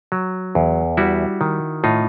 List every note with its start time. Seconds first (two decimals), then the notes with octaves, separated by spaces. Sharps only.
0.12 F#3
0.55 E2
0.97 G3 E4 F#4
1.41 D#3
1.84 A2 D#4 F4